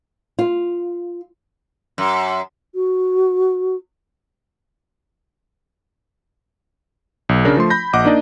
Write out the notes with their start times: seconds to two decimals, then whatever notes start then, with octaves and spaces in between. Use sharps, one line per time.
0.39 F4
1.98 F#2
2.75 F#4
7.29 B1
7.45 C#3 D4 A#4
7.57 F3 A3 C6
7.70 B5 G6 A#6
7.93 A#1 D#5 F#5 D6
8.05 A#3 D4 D#4 D5 D#5